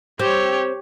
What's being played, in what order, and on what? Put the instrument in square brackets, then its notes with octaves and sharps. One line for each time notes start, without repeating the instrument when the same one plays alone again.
[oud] C4 [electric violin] G4 C#5